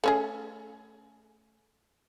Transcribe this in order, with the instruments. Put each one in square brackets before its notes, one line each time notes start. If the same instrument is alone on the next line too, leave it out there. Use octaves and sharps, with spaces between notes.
[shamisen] A3 C#4 G#4